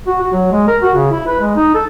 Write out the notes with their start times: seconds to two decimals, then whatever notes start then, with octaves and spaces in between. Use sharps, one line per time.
0.07 F#4
0.21 F#4
0.33 F#3
0.52 G#3
0.68 A#4
0.82 F#4
0.95 C#3
1.11 E4
1.27 B4
1.40 G#3
1.56 D#4
1.74 A4